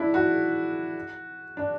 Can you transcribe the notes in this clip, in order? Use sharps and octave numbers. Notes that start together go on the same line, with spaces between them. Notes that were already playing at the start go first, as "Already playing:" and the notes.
Already playing: D4 E4
F#4
D4